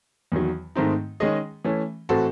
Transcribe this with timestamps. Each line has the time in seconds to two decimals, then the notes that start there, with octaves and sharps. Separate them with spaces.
0.32 E2 D#3 F#3
0.75 G#2 D#3 A3 C4 D#4
1.20 D#3 G#3 C#4 G#4 D#5
1.64 E3 A3 C#4
2.09 A2 E3 C4 F#4 A4